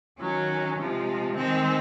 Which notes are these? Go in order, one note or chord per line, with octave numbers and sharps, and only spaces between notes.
D#3 F#3 C#4
C3 F3 G#3
D#3 G#3 C4